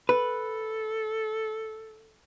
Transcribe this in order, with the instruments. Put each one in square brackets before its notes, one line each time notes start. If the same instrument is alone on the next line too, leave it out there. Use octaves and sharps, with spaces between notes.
[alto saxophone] A4 [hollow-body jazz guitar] B4